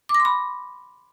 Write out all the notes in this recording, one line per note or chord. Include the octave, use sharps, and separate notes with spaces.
D6
A#6
C6
B5